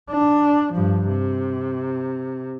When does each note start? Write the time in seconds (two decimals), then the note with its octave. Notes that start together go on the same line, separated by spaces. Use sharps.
0.10 D4
0.73 G2 F3
1.08 C3